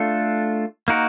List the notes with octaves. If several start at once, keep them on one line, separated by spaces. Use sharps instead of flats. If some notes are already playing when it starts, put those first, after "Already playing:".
Already playing: A3 D4 F4 A4
A#3 D#4 F#4 A#4